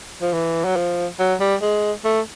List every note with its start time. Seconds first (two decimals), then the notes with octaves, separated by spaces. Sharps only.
0.22 F3
0.33 E3
0.65 F#3
0.76 F3
1.19 F#3
1.40 G3
1.62 G#3
2.05 A3